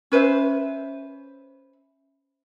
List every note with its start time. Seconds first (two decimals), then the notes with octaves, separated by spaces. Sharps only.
0.12 C#4 B4 C5 E5